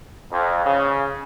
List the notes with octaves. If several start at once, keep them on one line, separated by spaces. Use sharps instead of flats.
F2
C#3